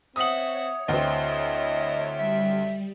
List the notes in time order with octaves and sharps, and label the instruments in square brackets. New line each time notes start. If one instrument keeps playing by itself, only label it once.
[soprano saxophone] C4 [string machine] C#5 [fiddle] E5 F#5 [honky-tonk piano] D#6 F#7
[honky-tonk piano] D2 C4 [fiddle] E4 [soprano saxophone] D#5
[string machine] G3 [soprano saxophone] E5